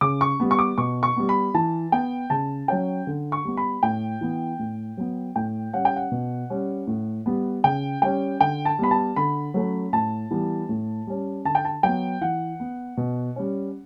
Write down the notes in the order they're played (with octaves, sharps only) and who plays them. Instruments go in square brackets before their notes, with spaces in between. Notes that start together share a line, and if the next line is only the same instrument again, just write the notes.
[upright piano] C#3 D6
C#6
G3 B3
C#6
D6
B2 C#6
C#6
G3 B3
B5
E3 A5
B3 G5
C#3 A5
F#3 C#4 G5
D3
C#6
G3 B3
B5
A2 G5
E3 B3
A2
F#3 B3
A2 G5
G3 C#4 F#5
G5
F#5
B2
G3 C#4
A2
G3 B3
C#3 G5
G3 C#4 G5
D3 G5
A5
G3 B3 B5
A5
D3 B5
F#3 A3 C#4
A2 A5
E3 G3 B3
A2
G3 C#4
D3 A5
G5
A5
F#3 B3 G5
E3 F#5
B3
B2
G3 C#4